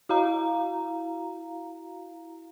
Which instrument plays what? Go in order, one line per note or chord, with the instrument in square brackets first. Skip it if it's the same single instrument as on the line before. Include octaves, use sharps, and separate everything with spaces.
[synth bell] E4 F#4 F5 A#5